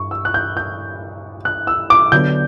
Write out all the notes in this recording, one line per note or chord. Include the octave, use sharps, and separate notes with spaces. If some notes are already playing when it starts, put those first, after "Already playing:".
Already playing: G2 C#6
E6
F#6
G6
G6
F#6
E6
D6
D3 F#3 B3 D4 G6